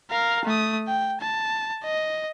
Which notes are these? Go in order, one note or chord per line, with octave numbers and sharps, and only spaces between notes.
A#4 F5
A3 D#6
G5
A5
D#5